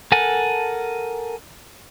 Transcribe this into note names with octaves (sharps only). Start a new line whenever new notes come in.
A4 A#4 F#5 G#5 A5